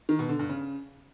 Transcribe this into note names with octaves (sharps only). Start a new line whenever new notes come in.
D#3
B2
D3
G2
C#3